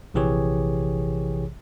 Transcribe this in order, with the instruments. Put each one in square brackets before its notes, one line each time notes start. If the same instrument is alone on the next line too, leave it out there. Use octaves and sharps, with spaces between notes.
[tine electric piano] A#1 C3 E3 G4 G#4 C#5